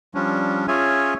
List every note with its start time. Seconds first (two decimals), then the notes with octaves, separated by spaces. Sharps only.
0.15 F3 G3 C#4 D4
0.68 C#4 F4 G#4 C#5 E5 G#5